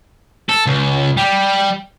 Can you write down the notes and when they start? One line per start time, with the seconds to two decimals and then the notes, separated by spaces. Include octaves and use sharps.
0.49 A4
0.66 C#2
1.17 G3